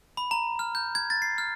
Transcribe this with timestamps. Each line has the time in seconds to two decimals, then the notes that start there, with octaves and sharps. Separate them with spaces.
0.17 B5
0.31 A#5
0.59 F6
0.75 G6
0.95 G#6
1.10 A6
1.22 C7
1.38 F6